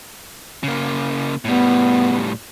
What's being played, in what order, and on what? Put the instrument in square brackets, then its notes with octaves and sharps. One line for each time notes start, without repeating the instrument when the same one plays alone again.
[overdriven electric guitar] C#3 A#3
[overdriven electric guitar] A2 G3 [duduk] B3